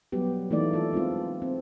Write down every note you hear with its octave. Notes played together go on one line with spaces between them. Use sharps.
F#3 G3 B3 G4
E3 A3 A#3 D#4 D5
F4 A4
G#3 C4 E4 F4
C4